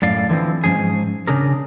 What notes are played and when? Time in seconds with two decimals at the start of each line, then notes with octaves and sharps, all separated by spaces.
0.02 F#2 A2 D5 F5
0.29 D3 E3 F3 C4
0.64 G#2 F3 C#4 G#4
1.27 C#3 D4 G#4 A#4